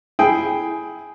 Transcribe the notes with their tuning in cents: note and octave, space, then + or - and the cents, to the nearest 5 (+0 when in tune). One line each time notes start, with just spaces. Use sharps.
E4 +0 G#4 +10 G5 +0